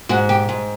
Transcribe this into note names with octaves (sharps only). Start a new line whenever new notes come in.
G#2 F#4
G4
G#2